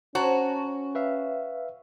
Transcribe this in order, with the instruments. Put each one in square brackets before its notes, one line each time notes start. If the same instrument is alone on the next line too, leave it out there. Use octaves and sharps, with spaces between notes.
[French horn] C#4 [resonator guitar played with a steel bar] F#4 [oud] C5 [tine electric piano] C#5 A5 A#5
[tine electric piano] B4 E5 F5